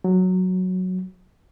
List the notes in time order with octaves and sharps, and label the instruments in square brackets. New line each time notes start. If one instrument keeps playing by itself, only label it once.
[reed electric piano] F#3